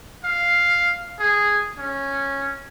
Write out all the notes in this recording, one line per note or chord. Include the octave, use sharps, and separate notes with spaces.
F5
G#4
C#4